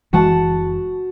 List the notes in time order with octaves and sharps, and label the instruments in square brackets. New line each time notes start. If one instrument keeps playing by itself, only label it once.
[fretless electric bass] F#1 E3 G#3 [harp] F#4 F#5 A5